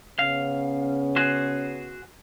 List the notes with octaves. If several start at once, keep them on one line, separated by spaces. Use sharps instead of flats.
C#3 B3 C#4 F5
F#4 G#4 C5